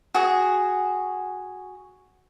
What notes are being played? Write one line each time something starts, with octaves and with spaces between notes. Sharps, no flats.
F#4 G#4